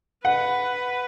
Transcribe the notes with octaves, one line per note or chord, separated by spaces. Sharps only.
B4 F#5